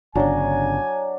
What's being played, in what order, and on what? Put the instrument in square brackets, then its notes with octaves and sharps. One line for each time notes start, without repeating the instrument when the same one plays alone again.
[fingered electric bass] G1 C#3 [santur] F#3 D4 [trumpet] G#5